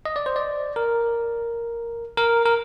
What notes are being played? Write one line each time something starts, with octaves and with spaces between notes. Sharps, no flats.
D#5
D5
C5
D5
A#4
A#4
A#4